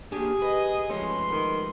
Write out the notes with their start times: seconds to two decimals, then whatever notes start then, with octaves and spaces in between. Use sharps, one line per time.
0.12 A#3 D4 G4 G#4
0.42 B4 D#5
0.90 F3 G#3 A3 C#4 B4 C6
1.31 D#3